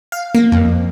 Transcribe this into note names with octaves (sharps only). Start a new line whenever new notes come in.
F5
A#3
F2